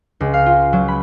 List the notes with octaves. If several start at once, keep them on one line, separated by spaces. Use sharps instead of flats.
C#2
F5
F4
F#3
B5